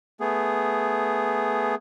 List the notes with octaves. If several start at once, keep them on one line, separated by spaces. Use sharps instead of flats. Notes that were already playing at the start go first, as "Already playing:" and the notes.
A3 B3 G#4